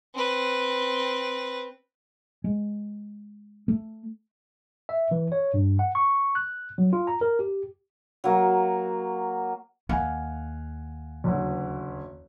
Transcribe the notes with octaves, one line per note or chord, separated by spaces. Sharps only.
C4 B4
G#3
A3
E5
E3
C#5
G2
F#5
C#6
F#6
F#3
F4
A#5
A#4
G4
F#3 A#3
D#2 F5 F#5 G#5
F#1 D2